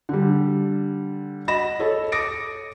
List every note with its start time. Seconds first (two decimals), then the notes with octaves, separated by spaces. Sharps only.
0.09 D3 G3
1.48 F#4 D#5 B5 A#6 E7
1.80 A4 C#5 D#5
2.12 D6 D#6 A#6 C#7 D7